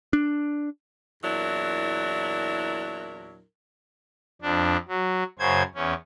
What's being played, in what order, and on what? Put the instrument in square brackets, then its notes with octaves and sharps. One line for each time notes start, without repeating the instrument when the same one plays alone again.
[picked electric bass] D4
[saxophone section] E2 A#2 F#3 D4 E4 A#4
[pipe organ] F2 D4
F#3
F#2 C#3 C5 G#6
E2 C#4